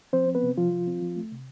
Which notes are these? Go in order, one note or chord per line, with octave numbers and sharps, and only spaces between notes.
F3 C4 C5
C4
B3 B4
C3
C3 F3 F4
F3
C4
F3
A3
C3